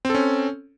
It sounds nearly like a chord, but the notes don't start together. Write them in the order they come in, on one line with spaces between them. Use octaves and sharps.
C4 A4 C#4